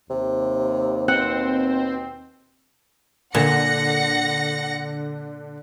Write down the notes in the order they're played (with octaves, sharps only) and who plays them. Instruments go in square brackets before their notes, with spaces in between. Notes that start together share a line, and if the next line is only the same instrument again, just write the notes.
[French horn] D#2 [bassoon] C3
[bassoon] B2 [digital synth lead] C4 [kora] F#5
[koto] A#2 [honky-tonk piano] D3 [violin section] F#5 A#6 C#7